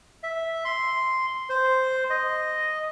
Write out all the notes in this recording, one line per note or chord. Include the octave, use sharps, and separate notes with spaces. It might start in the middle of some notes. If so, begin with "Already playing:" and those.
E5
C6
C5
D#5